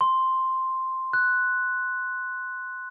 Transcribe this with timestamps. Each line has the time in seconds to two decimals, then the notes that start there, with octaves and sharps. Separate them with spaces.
0.01 C6
1.13 F#6